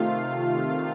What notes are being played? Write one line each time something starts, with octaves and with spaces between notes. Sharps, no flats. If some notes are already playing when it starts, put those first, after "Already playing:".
Already playing: C3 D#3 A3 F4 F5